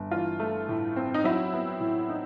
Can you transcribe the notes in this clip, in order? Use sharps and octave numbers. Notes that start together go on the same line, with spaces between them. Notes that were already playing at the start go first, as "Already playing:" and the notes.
Already playing: G1
E3 F4
A3
A2
C4
D#4
F#3 E4
B3
A2
D#4